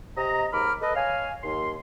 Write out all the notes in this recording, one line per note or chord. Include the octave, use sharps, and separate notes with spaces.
C3 D#5 A#5
D#2 G#2 A#5 B5 D6 F6
A4 B4 D#5
C#5 F5 G#5
D#2 C6